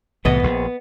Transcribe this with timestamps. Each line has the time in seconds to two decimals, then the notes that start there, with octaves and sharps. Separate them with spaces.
0.25 C2 A2 E3 B3 D#5
0.43 A#1